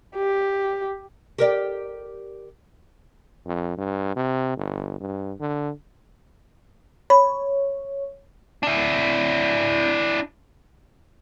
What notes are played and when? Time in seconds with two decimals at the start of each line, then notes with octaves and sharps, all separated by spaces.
0.16 G4
1.38 G4 A#4 D5
3.46 F2
3.78 G2
4.16 C3
4.57 G1
5.00 G2
5.40 D3
7.10 C#5 B5
8.63 D4 E4